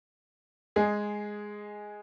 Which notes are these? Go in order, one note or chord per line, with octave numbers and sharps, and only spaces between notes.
G#3 G#4